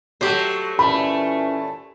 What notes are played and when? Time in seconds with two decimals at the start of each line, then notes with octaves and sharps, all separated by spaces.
0.21 F#3 A3 G4 C5
0.79 A#2 E3 A3 C#4 B5